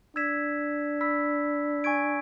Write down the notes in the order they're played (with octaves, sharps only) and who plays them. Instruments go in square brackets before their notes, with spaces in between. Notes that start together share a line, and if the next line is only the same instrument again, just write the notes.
[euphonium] D4 [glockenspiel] E6 G#6 B6 E7
[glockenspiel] B5 E6 B6
G#5 C#6 G#6 D7